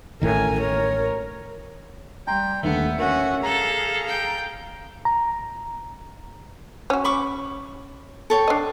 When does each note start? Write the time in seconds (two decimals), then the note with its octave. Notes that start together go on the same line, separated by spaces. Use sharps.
0.22 A1 A2 D#3 A#4 G#5
0.60 A#4 C#5
2.27 G3 G5 A#5 C6
2.63 D#2 D3 A3 B3 E5
2.99 C#4 F#4 A#4 F#5
3.44 G#4 A4 F5 A#5
4.07 G5
5.05 A#5
6.90 C#4 F#4
7.04 B5 C#6 D6
8.30 A4 C#5 G5
8.48 D4 D#5